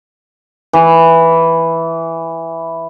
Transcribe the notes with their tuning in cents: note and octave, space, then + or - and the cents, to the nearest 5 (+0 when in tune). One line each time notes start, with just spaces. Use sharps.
E3 +0